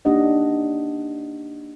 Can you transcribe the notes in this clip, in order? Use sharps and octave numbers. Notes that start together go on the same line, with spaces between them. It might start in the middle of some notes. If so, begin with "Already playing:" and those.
A#3 D4 D#4 G4 D#5 F#5